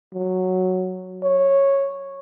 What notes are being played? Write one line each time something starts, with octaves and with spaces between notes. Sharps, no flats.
F#3
C#5